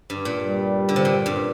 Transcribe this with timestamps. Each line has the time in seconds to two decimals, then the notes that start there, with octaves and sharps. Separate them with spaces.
0.10 G2
0.25 A#2
0.41 G3
0.89 D3
0.96 C3
1.05 A#2
1.26 G2